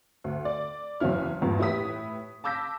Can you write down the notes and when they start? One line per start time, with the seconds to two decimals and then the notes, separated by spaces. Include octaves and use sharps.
0.24 D2
0.45 D5
1.00 F#1 E2 F#3 C#4 E4 F6
1.42 A1 E2 G2 A#2
1.59 A2 E4 G4 B4 D#6 B6
2.44 A5 D6 E6 G6 A#6 B6